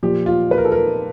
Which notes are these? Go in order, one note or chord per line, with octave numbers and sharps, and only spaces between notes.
A#2 F3 G4
F4
B4
A#4
A4
A#4